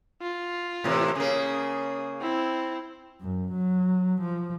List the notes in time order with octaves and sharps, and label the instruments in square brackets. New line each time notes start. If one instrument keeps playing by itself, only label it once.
[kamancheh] F4
[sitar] A2 C3 E3
[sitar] C#3 A#3 [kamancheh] G#4
[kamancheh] C4 E4
[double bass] F#2
F#3
F3